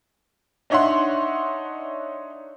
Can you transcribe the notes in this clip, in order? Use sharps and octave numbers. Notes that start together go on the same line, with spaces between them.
D4 D#4 C#5 E5 F#5 C6